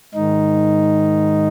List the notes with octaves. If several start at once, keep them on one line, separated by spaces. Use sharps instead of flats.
G#2 D#3 D#4